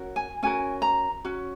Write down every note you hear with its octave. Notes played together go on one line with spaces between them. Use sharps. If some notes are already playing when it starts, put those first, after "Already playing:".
Already playing: C#4 F#4 A#4
G#5
C#4 F#4 A#4 G#5
A#5
C#4 F#4